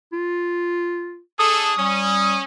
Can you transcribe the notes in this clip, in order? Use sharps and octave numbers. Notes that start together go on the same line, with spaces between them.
F4
D4 G#4 A4 D#6
G3 C#4